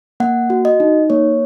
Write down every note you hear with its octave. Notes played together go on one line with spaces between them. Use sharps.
A#3 F#5
F#4
D#5
D#4
A#3 C#5